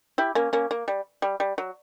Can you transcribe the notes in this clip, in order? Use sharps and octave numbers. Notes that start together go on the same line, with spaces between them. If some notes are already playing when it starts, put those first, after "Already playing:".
E4 G4
A#3 C#4
A#3 C#4
A#3
G3
G3
G3
F#3